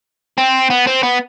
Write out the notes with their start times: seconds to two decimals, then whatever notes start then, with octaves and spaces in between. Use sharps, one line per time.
0.38 C4
0.70 B3
0.87 C4
1.03 B3